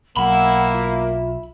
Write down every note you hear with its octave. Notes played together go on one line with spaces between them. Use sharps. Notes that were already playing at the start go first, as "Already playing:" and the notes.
B1 F#3 A#3 E5 F#5 B5
F4